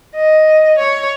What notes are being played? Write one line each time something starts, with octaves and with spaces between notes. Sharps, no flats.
D#5
C#5